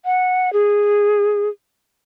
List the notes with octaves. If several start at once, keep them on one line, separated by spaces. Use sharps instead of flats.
F#5
G#4